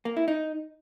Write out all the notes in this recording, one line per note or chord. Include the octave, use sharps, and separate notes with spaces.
A#3
E4
D#4